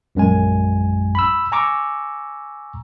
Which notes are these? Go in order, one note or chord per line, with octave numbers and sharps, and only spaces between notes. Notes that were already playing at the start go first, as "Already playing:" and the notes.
A#1 F#2 G#3 G#5
B5 E6
G#5 A#5 C#6 D6 E6